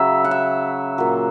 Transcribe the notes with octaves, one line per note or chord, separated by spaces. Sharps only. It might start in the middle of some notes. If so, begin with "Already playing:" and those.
Already playing: C#3 F#3 E5
F#5
E5
A#2 F#3